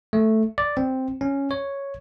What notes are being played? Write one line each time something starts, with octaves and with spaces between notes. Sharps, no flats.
A3
D5
C4
C#4
C#5